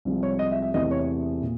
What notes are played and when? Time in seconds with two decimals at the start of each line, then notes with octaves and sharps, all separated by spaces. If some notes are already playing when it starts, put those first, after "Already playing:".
0.05 C2 C3 F3 G#3
0.23 C#5
0.39 D#5
0.51 E5
0.62 E5
0.74 E2 C3 E3 A3 D#5
0.91 C#5
1.42 A#2